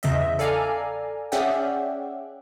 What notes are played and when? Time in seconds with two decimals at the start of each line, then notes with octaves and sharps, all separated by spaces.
0.03 E2 C#3 E3 D#5 E5
0.39 A4 D5 F5 G#5 A#5
1.32 C#4 G#4 D5 E5 F#5 G5